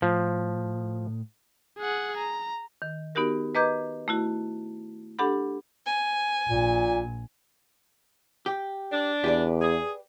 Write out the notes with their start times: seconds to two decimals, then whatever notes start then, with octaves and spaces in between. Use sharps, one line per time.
0.02 A2 F3
1.79 G#4 F#5
2.17 A#5
2.82 D#3
3.15 B3 D#4 F#4 G4 A#4
3.55 B4 D#5 A#5 D6 G6 G#6
4.08 A3 E4 F#4
5.19 D4 G4 A4 F#5 B5
5.86 G#5
6.49 A#1 A#2
8.46 G4
8.92 D4
9.24 E2 G4 B4 D5
9.61 G#4